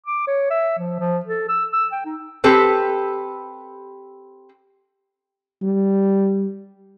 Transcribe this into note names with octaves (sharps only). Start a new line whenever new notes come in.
D6
C#5
E5
F3
F3
A4
E6
E6
G5
D#4
C4 G4 A4 B4
G3